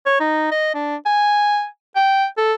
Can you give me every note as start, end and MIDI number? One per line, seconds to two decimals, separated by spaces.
0.06 0.19 73
0.20 0.51 63
0.51 0.72 75
0.74 0.96 62
1.06 1.66 80
1.96 2.26 79
2.38 2.53 69